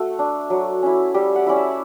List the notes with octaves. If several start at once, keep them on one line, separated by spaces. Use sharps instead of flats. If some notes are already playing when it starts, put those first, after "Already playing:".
Already playing: A3 F#4
D4
F#3
C#4 E4
G3 G4
F#5
C#4 E4 D5
E5